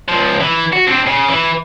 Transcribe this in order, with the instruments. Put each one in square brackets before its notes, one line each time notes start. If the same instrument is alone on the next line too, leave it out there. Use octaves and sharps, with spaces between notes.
[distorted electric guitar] C#2 F3
E3
F#4
C4 D4
C#3
E3